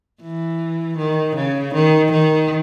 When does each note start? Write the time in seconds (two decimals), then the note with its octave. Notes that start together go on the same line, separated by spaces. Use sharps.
0.22 E3
0.98 D#3
1.36 C#3
1.74 D#3
2.12 D#3